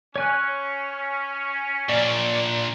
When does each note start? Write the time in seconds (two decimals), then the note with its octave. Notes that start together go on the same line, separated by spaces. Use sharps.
0.16 C#4 C#5 G#5 F#6
1.89 A#2 D4 D5